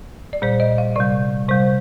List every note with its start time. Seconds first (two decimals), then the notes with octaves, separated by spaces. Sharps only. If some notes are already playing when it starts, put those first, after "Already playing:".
0.33 D5
0.42 A#2 G3 C5
0.60 D#5
0.78 F5
0.96 C3 G3 D5
1.49 C3 G3 C5